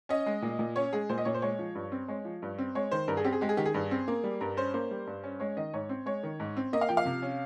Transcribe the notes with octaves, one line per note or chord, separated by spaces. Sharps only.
C#4 D#5
G#3
A#2
A#2
C#4 C#5
G#3 G#4
A#2 C5
D#5
A#2 C#5
C5
G#3 C#5
F3
G2
C4
G#3 C#5
F3
G2
C4
G#3 C#5
D#3 C5
G2 A#4
G#4
C4 G4
G#4
G#3 G4
G#4
D#3 G4
G#4
G2
C4
A#3
G3
G2 A#4
C#4 C5
A#3 C5
G3
G2
C#4
G#3 C#5
D#3 D#5
G#2 C#5
C4
G#3 C#5
D#3
G#2
C4
A#3 D#5
F5
F3 G5
F5
C3
C#4